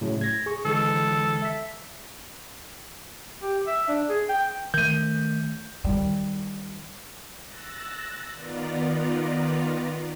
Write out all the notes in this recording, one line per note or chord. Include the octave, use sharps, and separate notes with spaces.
A2 C#3 F#3
G#6 A#6
G#4 C#6
D3 E3 G#3 A4
E5 B6
G4
E5
D4
G#4
G5
D#3 A3 G6 D#7
D#3 G3
E6 F#6 A6 A#6
D#3 B3 F4 D5 A#5